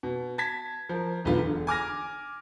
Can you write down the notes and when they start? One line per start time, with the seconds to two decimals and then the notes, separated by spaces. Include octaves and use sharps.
0.03 B2
0.38 A5 G#6 B6
0.89 F3 A#4
1.25 E1 B1 D3 B3 F4
1.44 E1 D3
1.67 G#5 D6 F6 A#6